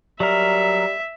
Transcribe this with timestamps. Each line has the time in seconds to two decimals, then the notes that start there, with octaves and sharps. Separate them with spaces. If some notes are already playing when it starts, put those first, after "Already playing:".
0.20 F#3 G3 A#4 E5